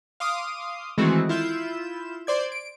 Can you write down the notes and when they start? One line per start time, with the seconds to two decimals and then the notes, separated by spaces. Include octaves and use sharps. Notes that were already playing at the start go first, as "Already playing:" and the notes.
0.20 F5 C6 D6 D#6
0.98 D#3 E3 G#3 A3 C4 F#4
1.29 E4 F4 G6 E7
2.27 C5 D5 G#6
2.52 D7